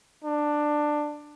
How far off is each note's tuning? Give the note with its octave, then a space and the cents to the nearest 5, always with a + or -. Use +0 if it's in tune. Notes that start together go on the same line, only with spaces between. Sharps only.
D4 +15